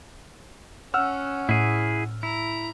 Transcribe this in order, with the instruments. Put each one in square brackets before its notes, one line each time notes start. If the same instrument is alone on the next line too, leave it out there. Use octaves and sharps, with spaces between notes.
[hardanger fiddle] C#4 [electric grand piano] F#5 E6 F6
[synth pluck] A2 [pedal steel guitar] E4 G#4
[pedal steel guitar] E4 [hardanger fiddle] A#5